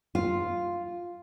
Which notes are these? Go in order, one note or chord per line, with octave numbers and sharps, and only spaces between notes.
F4